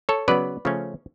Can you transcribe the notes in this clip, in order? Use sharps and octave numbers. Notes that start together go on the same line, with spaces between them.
A4 C#5
C#3 F#3 B3 B4 D5
C#3 F3 A3 C#4